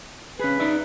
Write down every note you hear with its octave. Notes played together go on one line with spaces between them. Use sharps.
C#4 G#4 B4
D#4 D5 E5